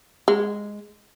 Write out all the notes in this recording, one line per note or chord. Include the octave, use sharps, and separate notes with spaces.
G#3